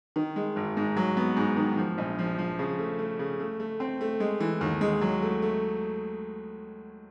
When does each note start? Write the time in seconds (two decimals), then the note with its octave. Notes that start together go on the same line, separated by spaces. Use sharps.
0.16 D#3
0.36 G#3
0.56 G#1
0.77 G#2
0.96 F#3
1.17 B3
1.37 G#2
1.57 D#3
1.77 F3
1.98 A#1
2.19 F3
2.38 F3
2.59 C#3
2.79 A3
2.99 A3
3.19 C#3
3.40 A3
3.60 A3
3.80 C4
4.01 A3
4.20 G#3
4.40 E3
4.61 D#2
4.81 G#3
5.01 F#3
5.22 A3
5.42 A3